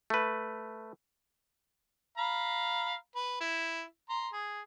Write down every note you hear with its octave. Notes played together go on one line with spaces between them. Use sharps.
A3 B4
F5 A#5 B5
B4
E4
A#5 C6
G#4